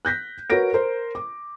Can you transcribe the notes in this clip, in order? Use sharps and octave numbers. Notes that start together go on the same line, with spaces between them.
F#6 G6 A#6 B6
F#4 A#4 B4 C#5 A#6 D7
A#4 C5
D6